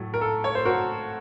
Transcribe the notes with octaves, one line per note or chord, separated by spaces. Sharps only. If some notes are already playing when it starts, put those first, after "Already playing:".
Already playing: A2 F#3 A3
A#4
A4
C#5
C5
F#4 A#4